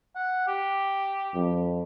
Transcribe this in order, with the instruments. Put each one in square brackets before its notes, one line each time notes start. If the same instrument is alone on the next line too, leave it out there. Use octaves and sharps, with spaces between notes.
[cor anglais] F#5
G4
[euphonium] F2